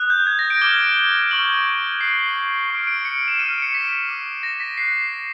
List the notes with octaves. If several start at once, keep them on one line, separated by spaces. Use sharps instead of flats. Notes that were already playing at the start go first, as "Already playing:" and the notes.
Already playing: D#6 F#6
G6
G#6
A#6
D7
D6 F6 G7
C#6 F6 F#7
D6 F#6 C7
C#6 F6 D7
D7
C#7
E7
D6 F6 D#7
D7
C#7
B6
D6 F6
A#6
B6
D6 F#6 C7